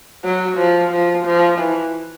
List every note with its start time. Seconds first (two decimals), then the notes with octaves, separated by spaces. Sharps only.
0.24 F#3
0.58 F3
0.91 F3
1.26 F3
1.59 E3